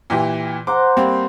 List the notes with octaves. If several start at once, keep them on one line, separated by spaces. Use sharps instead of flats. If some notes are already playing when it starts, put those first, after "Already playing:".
A#2 E3 G4
C5 F#5 A#5 D6
G3 A#3 C4